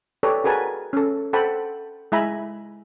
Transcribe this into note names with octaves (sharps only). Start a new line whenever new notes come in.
G4 A4 B4 C#5 D5
F#4 G#4 A#4 B4 G#5 A5
C#4 A4
A4 C5 F#5 G5 A5 B5
G#3 E4 E5 G#5 A#5 B5